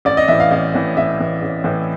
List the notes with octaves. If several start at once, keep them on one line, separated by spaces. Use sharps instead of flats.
A1 D5
D#5
A2 E3 E5
F5
A1 F5
A2 E3
A1 E5
A2 E3
A1
A2 E3